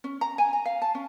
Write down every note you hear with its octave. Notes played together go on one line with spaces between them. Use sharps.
C#4
A#5
G#5
A#5
F5
A5
C#4